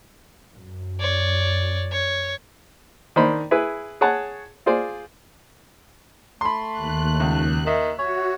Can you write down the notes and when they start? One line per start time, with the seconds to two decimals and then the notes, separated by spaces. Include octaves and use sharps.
0.55 F#2
1.00 C#5 D5
1.92 C#5
3.16 D#3 D4 C5 B5
3.51 E4 G#4 B4
4.01 G#4 C#5 F#5 A5
4.66 F4 G#4 C5 D5
6.41 A3 B5 C6
6.72 D#2 F#6
7.20 C#2
7.67 D#3 E5
7.99 F#4 C#5